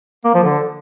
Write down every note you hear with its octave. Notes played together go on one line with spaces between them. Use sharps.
A#3
F3
D3